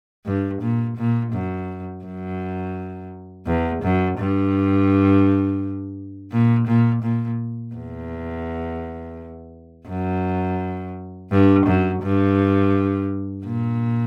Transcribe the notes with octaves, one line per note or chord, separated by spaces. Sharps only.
G2
A#2
A#2
F#2
F#2
E2
F#2
G2
A#2
A#2
A#2
E2
F#2
G2
F#2
G2
A#2